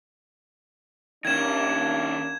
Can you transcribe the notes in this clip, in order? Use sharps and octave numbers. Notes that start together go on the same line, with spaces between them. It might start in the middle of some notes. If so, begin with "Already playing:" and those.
D#2 D#3 A#3 C#4 D4 G#6 E7